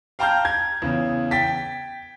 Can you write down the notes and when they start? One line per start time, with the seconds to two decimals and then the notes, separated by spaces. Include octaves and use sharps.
0.19 F5 G5 A5 A#5 F6 G6
0.45 G#6
0.82 E2 C#3
1.31 G5 A6 B6